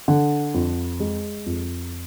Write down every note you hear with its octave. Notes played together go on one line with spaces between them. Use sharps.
D3
F2
G#3
F2